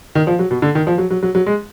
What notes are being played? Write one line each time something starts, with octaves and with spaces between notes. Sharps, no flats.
D#3
F3
F#3
B2
D3
D#3
F3
F#3
F#3
F#3
F#3
G#3